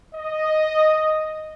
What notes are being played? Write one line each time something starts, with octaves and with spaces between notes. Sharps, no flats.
D#5